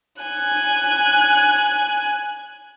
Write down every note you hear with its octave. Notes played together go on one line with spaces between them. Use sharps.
G#5 F#6